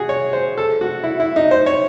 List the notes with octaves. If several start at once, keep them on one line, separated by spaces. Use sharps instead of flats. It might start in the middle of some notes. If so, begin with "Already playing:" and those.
Already playing: F#4 G#4
C#5
C5
A4
F#4
E4
E4
D#4
C5
C#5